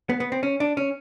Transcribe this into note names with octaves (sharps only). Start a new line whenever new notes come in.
B3
B3
C4
C#4
D4
C#4